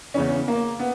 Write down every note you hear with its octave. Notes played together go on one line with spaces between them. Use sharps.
E2 C#3 E3 C#4
A#3
B3